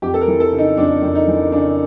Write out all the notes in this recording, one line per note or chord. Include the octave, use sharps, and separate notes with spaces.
F2 G4
A4
A#4
E3
A4
C#3
D#4
F2 D4
F2
D#4
E3
C#3 D4